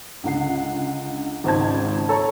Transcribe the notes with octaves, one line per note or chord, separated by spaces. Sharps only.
C#2 D3 F#5 C7
G#1 C#2 G#2 C5 A5 G#6
A4 C#5 A#5 C#6